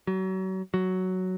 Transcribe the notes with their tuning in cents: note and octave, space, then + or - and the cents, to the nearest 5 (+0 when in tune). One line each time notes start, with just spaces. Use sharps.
F#3 +35
F#3 +5